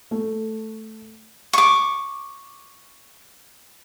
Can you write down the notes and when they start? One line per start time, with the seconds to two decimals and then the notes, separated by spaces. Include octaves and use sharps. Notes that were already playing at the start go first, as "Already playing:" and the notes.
0.11 A3
1.53 C#6 D6